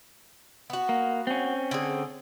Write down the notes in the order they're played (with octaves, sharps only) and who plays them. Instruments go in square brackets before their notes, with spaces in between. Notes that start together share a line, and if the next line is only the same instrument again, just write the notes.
[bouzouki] B3 F#4
[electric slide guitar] A#3
C4 C#4
[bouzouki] D3 G#4